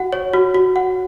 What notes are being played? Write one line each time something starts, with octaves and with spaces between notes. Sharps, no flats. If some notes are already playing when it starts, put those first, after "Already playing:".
Already playing: F#4 F#5
C#5
F#4
F#4
F#5